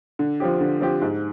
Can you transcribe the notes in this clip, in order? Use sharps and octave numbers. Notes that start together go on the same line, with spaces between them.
D3
F3 C4 G4
D3
F3 C4 G4
G#2